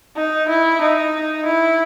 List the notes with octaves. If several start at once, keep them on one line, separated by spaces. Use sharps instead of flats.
D#4
E4
D#4
E4